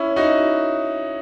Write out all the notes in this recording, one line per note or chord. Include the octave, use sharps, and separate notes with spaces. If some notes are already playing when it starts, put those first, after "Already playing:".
Already playing: C#4 E4
D#4 F#4